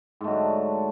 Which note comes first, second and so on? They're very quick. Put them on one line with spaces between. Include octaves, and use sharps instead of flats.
G#2 A3 F#3 D3